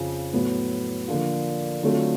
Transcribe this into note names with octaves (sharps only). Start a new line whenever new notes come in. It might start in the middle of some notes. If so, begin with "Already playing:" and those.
Already playing: F2 C#3 F3
A2 F#3 B3
D3 F3 A#3 D4 F4
D3 F#3 A3 C4 F4